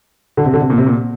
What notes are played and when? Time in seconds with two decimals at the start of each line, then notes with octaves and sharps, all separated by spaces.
0.37 D3
0.45 C3
0.54 D3
0.61 C3
0.70 A#2
0.78 C3
0.86 A#2